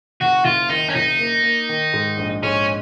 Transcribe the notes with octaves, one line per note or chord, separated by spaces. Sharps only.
F#1 F#4
F#1 F4
D#3 D#4
C#4
F#1 D#4
A#3
A#3
D#3
G#2
A#1
G#2 C#4